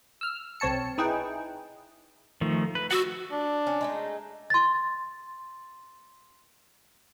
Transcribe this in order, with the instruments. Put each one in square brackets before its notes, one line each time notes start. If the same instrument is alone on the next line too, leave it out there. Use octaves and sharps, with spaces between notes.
[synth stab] E6 F6
B1 C4 C#5 A5 C#7
D#4 E4 G#4 B4 G5
[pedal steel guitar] D#3 F3 A3
B4
[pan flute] F#4 [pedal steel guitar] F#5 D6 E6
[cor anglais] D4
[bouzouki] C#4
G#3 A3 D#4
[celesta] C6 A6